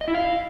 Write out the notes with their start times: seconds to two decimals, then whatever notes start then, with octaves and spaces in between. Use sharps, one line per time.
0.01 D#5
0.08 E4
0.14 F5